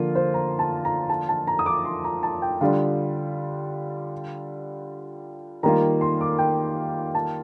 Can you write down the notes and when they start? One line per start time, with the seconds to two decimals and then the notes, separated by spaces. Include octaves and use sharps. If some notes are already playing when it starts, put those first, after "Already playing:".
Already playing: D3 F3 A#3 F4
0.15 C5
0.34 A#5
0.59 A5
0.85 A#5
1.09 A5
1.29 A5
1.47 A#5
1.59 D#6
1.66 D6
1.85 C6
2.04 A#5
2.23 A5
2.42 G5
2.61 D3 G3 D4 F4 F5
5.63 D#3 G3 A#3 F4 A#5
6.01 C6
6.21 D6
6.39 G5
7.15 A5